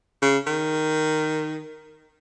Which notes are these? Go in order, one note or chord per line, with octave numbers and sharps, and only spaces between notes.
C#3
D#3